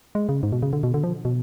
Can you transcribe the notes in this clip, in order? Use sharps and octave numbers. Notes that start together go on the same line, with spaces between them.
G#3
C#3
G#2
B2
C#3
D3
B2
D3
F3
B2